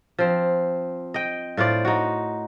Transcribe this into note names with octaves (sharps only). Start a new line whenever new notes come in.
F3 C4
D#5 G5
A2 F4 C5 D5
D#4 F#4